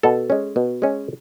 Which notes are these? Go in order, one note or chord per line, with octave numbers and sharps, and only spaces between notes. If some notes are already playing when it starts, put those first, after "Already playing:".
B2 A4
G#3 C#4
B2
G#3 C#4